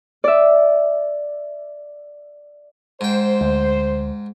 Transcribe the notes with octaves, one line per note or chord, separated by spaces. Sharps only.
D5 E5
G#2 C5 G5
D2